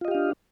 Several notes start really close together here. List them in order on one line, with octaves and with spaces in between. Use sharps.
F4 D#5 G4 F5 D4